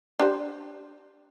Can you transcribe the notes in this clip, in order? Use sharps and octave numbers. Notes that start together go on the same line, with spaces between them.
D4 G4 C5